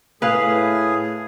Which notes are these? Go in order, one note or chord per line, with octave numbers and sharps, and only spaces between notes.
A2 G#4 B4 F5